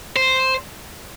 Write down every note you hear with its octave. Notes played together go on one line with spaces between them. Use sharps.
C5